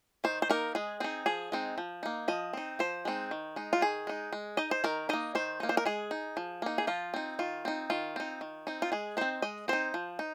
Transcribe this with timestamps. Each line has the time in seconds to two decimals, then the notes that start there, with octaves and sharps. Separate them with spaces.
0.24 D#3 C5
0.42 C5
0.49 A#3 D#4 A#4
0.75 G#3 G#4
1.00 C4 D#4 G#4
1.26 F3 G#4
1.52 G#3 C4 D#4
1.78 F3
2.03 A#3 D#4
2.28 F3 D#5
2.53 C4 D#4
2.79 F3 C5
3.05 G#3 C4 D#4
3.31 D#3
3.56 G#3 D#4
3.73 F4
3.81 D#3 G#4
4.07 G#3 D#4
4.33 G#3
4.57 D#4 D#5
4.71 C5
4.84 D#3 A#4
5.09 A#3 D#4 D#5
5.35 D#3 C5
5.60 A#3 D#4
5.69 C5
5.77 A#4
5.85 G#3 G#4
6.11 D#4
6.37 F3
6.62 A#3 D#4
6.78 G#4
6.87 F3 F4
7.14 C4 D#4
7.39 D#3 F4
7.65 C4 D#4
7.90 D#3 F4
8.16 C4 D#4
8.41 D#3
8.67 C4 D#4
8.82 F4
8.92 G#3 G#4
9.17 C4 D#4 C5
9.42 G#3 D#5
9.68 C4 D#4 C5
9.94 F3
10.19 D#4